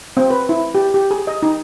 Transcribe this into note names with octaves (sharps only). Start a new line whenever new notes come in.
C4
B4
E4
G4
G4
G#4
D#5
D#4